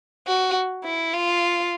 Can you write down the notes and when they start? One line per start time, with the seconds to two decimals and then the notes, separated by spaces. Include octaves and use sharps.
0.27 F#4
0.84 E4
1.13 F4